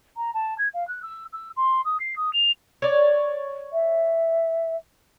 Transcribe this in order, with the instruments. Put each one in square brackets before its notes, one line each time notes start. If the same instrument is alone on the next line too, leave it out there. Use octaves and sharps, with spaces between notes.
[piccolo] A#5
A5
G#6
F5
F#6
E6
E6
C6
D#6
C7
D#6
F7
[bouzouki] C#5 D5
[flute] E5